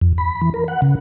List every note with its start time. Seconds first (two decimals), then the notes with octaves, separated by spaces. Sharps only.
0.01 F2
0.18 B5
0.42 E3
0.54 A#4
0.68 F#5
0.82 C#3